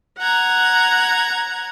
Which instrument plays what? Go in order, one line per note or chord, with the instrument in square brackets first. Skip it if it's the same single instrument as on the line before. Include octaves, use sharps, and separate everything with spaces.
[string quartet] F#5 A#5 G#6